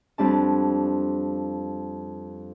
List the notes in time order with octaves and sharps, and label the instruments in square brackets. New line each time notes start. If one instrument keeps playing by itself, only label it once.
[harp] F2 G3 D4 A5